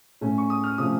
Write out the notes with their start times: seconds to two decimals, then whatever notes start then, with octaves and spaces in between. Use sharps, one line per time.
0.21 A2 A3 C#4
0.38 C#6
0.50 D#6
0.64 F6
0.78 C3 F3 A3 C#4 D#6